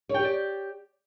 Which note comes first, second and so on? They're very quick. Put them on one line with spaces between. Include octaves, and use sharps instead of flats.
C#5 G5 G4 D5